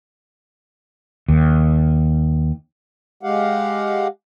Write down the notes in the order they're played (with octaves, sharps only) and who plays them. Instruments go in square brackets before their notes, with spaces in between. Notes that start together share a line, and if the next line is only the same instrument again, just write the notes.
[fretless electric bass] D#2
[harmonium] G#3 G4 F5 F#5